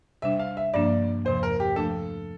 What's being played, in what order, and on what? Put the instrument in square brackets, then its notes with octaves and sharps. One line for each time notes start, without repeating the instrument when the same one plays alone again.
[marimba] C3 G3 D4 [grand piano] E5
[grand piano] F5
E5
[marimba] G2 F3 A#3 D4 [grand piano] D5
[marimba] E2 C3 F3 [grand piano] C5
[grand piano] A#4
G4
[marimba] F3 A3 D4 [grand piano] A4